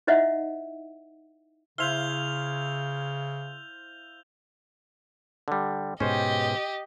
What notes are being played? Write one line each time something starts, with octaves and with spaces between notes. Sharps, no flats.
D#4 E4 C5 D#5 E5 F#5
C#3 E4 C5 F5 G6 F7 G7
D3 G3
G#2 B2 C#4 G4 C5 D#5